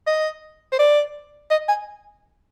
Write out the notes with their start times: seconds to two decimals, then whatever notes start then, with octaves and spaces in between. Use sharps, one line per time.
0.07 D#5
0.72 C5
0.79 D5
1.51 D#5
1.68 G#5